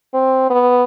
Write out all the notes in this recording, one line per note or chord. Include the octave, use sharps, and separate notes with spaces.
C4
B3